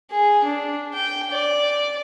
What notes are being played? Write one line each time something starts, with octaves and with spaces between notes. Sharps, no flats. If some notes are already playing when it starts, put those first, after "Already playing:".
G#4
D4
G5
D5